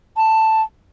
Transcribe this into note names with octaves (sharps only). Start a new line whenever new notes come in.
A5